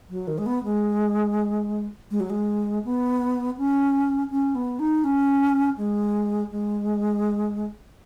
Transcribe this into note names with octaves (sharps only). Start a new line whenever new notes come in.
F#3
D#3
G#3
B3
G#3
G#3
F#3
G#3
B3
C#4
C#4
B3
D#4
C#4
G#3
G#3